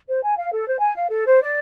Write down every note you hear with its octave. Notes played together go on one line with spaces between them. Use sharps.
C5
G#5
F5
A4
C5
G#5
F5
A4
C5
D5